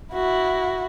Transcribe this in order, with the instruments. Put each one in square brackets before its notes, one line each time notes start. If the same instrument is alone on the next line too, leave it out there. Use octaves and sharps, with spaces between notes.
[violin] E4 F#4